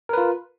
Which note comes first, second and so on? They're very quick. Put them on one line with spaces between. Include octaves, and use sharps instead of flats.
A#4 B4 F4